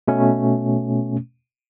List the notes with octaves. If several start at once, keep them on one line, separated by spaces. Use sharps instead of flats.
B2 A3 C#4